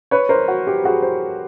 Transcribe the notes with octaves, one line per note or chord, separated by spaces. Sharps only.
B4 C#5
A#4 C5
F#4
G4
F#4 G#4
C5